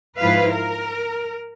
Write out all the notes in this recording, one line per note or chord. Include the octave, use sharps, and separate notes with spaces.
G#2 F3 E4 F4 B4 F5
A#4